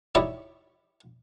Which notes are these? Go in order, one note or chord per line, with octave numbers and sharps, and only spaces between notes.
D#4 E4 G4 C#5 D5